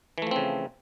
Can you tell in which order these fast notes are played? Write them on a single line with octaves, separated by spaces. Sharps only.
E3 A3 F3 C4 C#3